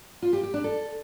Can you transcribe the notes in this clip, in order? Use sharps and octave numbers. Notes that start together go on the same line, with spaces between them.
F4
G4
G4
D4
A4